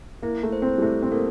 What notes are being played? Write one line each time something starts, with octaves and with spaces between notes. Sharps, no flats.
A#3 E4
A3
C5
C4
G3
A3 E4
C4
A#3 A4